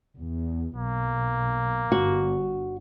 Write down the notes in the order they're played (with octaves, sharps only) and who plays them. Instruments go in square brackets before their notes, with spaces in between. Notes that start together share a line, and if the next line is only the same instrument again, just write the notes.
[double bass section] E2
[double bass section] B1 [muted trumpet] A#3
[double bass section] G1 G2 [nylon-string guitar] F#4